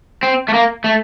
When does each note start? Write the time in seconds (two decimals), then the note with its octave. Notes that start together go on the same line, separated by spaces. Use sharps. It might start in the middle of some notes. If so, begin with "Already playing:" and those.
0.23 C4
0.48 A3
0.54 A#3
0.84 A3